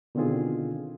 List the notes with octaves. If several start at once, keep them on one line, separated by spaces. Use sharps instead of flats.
B2 D3 D#3 C4 F4 G#4